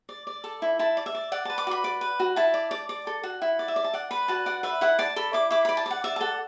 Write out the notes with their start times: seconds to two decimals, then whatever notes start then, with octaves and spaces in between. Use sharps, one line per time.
0.09 D5
0.27 D5
0.44 A4
0.62 E4
0.79 E4 A5
0.97 D5
1.06 E5
1.15 D5
1.32 D5 F#5
1.45 B4 A5
1.58 D6
1.67 F#4 B5
1.84 D5
2.01 B4
2.20 F#4
2.36 E4 A5
2.54 D5
2.71 D5
2.89 D5
3.07 A4
3.23 F#4
3.42 E4 F#5
3.59 D5
3.68 E5
3.76 D5
3.84 A5
3.94 D5 F#5
4.11 B4 B5
4.28 F#4 A5
4.46 D5 F#5
4.63 B4 E5
4.81 E4 F#5
4.99 D5 A5
5.16 A4 B5
5.33 E4 D6
5.51 E4 D6
5.65 D5 B5
5.77 A5
5.86 D5 F#5
6.04 D5 E5
6.16 A5
6.20 A4 F#5